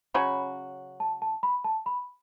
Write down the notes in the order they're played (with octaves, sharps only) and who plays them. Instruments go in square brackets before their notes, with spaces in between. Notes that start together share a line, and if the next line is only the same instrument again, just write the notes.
[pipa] C#3 F#3 C#4 F#4 [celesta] B5
[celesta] A5
A5
B5
A5
B5